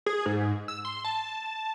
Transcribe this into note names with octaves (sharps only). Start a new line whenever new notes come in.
G#4
G#2
E6
C6
A5